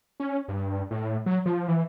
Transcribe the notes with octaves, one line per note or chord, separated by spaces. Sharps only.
C#4
G2
A2
F#3
F3
E3